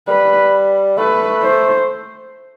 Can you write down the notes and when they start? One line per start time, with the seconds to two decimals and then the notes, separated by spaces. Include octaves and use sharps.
0.08 G3 B4
0.98 A3 B4
1.43 C5